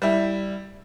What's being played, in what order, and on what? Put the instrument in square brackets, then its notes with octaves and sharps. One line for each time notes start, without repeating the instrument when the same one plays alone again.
[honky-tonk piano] G3 E4